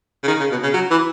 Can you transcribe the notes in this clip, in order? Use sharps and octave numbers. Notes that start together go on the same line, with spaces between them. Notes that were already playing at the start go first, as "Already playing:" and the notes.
C#3
D#3
C#3
B2
C#3
F#3
E3